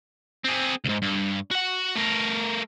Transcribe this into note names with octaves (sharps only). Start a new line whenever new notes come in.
C4 G#4
C#2 G#2
G2
F#4 F#5
A3 A#4